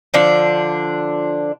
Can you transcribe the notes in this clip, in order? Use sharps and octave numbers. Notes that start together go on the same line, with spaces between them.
D3 F3 D4